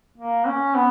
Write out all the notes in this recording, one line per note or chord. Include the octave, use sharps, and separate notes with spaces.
A#3
C#4
B3